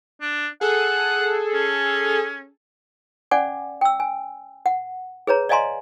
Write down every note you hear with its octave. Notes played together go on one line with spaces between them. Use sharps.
D4
G#4 A4 F#5
C#4
C#4 D5 F#5 G#5 D6
G5 E6
G#5
F#5
G#4 B4 C#5 A#5
D5 D#5 F5 G#5 A#5 C6